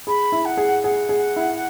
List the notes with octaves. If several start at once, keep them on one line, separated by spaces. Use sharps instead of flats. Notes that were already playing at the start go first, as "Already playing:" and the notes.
G#4 B5
E4
F#5
G#4
G#4 F#5
G#4
E4